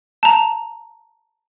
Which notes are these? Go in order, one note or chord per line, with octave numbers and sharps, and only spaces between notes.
A5 A#5